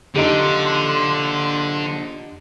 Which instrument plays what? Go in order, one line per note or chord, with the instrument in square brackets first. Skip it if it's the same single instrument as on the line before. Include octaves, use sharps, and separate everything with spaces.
[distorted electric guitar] D3 [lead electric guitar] D4 F4 [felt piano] D#4 G4 [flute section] C6